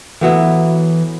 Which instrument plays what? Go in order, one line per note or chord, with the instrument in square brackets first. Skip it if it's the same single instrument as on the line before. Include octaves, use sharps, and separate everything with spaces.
[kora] A2 F#3 B3 E4 [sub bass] E3